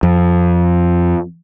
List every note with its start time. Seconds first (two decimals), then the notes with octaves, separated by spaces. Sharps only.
0.03 F2